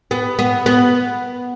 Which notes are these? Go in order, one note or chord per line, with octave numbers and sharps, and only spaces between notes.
B3
B3
B3